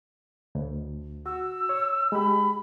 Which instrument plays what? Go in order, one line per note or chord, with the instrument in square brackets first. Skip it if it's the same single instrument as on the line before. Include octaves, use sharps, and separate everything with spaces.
[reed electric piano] D2
[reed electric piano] F#4 [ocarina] E6
[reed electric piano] C#5
[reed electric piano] G#3 G4 [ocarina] B5